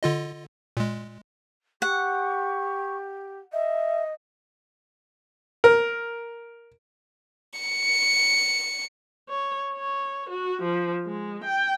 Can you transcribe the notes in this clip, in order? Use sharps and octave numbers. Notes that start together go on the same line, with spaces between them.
D3 F4 D#5
A#2 G#3
G4 F#5 C#6
D#5 E5
A#4
C#7
C#5
C#5
F#4
F3
G#3
G5